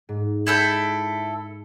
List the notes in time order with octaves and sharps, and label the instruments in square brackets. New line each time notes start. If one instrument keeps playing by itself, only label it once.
[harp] G#2
[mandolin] E4 A4 G5